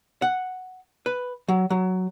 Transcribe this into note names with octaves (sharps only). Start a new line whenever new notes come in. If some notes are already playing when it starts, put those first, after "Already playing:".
F#5
B4
F#3
F#3